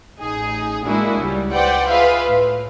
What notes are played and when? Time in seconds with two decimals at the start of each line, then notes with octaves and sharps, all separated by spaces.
0.21 A1 D#4 G#4
0.86 G#3 A#3 D4 E4 F#4 G#4
1.19 C#2 G3
1.52 B4 C5 D5 F#5 G5
1.89 F4 G#4 B4 E5 F5
2.27 A2